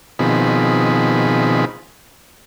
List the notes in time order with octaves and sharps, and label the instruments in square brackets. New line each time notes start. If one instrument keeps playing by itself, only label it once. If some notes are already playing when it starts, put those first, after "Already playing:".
[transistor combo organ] B2 D#3 F3 C4 G#4 B5